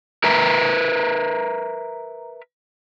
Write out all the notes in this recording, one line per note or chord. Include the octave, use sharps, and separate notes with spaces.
A#4 B4 E5 A#5